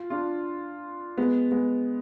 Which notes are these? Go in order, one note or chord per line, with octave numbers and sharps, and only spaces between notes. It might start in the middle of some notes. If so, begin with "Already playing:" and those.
Already playing: F4
D4 F4
G#3 B3
G#3 B3